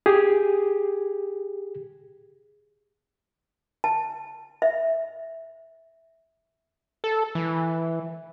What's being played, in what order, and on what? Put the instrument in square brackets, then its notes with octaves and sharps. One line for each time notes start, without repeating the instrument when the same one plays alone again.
[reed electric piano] G4 G#4
[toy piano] A5
E5
[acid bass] A4
E3